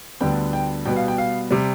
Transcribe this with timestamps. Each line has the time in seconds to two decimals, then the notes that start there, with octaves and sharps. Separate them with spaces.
0.20 D2 D3 G3 B3 G5
0.53 G5
0.85 B2 G3 B3 G5
0.96 F5
1.08 G5
1.18 F5
1.51 C3 G3